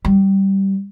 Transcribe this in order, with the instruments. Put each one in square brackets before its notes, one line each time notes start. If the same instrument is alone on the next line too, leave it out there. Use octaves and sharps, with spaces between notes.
[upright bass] G3